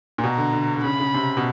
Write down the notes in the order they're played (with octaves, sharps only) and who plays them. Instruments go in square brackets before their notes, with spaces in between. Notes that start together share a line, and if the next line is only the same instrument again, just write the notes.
[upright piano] A#2
[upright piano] B2 [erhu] A#5
[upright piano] D3
D3
D3
[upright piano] C#3 [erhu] B5
[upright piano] C#3
C3
B2